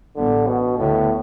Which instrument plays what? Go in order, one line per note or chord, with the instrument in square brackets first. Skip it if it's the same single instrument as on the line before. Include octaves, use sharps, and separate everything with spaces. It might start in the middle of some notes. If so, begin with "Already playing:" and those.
[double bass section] A1 A2 G3 B3 [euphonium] D3
[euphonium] B2
[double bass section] D2 D3 B3 [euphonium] A2